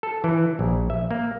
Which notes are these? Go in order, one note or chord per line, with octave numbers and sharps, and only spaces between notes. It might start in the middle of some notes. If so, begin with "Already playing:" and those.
A4
E3
A#1
E5
A#3